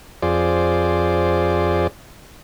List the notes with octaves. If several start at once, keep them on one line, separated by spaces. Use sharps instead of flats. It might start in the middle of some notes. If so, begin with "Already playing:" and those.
F2 F4 G#4 C5 D5